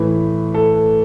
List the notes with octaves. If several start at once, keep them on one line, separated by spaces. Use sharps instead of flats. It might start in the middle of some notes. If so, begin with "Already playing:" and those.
Already playing: A2 E3 B4
A4